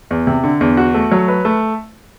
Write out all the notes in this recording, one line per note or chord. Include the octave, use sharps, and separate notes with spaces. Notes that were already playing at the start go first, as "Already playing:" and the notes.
E2
C3
D3
E2
F#4
A3
F#3
B4
A3